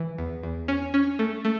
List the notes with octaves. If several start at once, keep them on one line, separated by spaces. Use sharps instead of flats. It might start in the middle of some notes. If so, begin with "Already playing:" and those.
Already playing: E3
E2
E2
C#4
C#4
A3
A3